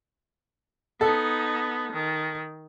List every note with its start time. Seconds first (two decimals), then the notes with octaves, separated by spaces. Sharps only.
1.01 B3 D#4 A4
1.93 D#3